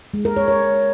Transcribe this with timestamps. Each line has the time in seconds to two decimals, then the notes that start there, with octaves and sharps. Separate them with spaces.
0.14 G#3
0.25 A#4
0.37 C#5
0.48 C#5